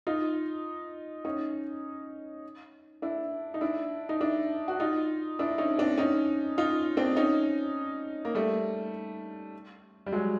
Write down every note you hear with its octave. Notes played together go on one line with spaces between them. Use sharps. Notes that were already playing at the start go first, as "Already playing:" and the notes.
D#4 F4
C#4 D#4
D4 E4
D#4
D4 E4
D#4
D4 E4
F#4
D#4 F4
D4 E4
C#4 D#4
C4 D4
C#4 D#4
D#4 F4
C4 D4
C#4 D#4
A#3
G3 A3
G3
F#3 G#3